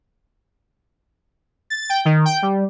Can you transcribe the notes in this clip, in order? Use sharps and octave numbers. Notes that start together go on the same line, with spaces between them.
A6
G5
D#3
G5
G3